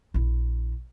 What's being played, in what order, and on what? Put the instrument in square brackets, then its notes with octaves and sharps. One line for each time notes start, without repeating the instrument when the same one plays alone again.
[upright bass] A#1 E4